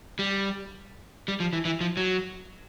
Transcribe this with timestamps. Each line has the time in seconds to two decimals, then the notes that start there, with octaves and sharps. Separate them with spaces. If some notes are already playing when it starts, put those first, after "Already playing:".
0.19 G3
1.28 G3
1.40 F3
1.53 E3
1.65 E3
1.81 F3
1.97 F#3